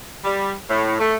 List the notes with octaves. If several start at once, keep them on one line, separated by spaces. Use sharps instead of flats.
G3
A2
A3